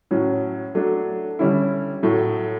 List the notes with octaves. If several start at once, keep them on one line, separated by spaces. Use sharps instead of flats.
A2 F#3 C#4
F#3 A3 D4
D3 G3 C#4 E4
A2 F#3 A3